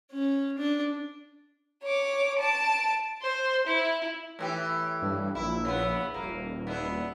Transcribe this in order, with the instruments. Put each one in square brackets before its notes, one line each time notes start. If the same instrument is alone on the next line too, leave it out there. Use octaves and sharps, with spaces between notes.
[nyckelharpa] C#4
D4
[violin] C#5 D6
A5 D7
[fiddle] C5
E4
[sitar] A2 E3 G4
[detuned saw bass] G2
[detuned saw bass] A#1 [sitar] E4
[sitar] C#3 B3
[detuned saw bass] D#1 [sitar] A#3
[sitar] B3 D4 E4